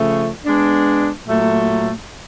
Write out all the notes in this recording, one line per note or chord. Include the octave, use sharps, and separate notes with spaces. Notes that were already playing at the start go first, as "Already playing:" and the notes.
Already playing: C#3 F3 A3
G#3 B3 D4
A#2 F#3 A3